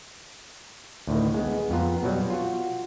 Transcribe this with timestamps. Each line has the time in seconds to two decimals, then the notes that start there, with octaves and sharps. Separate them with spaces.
1.07 D2 A2 D#3
1.34 G#3 B3
1.70 F2 B3 F4 A#5
2.03 B2 F#3 G3
2.30 F4 F#4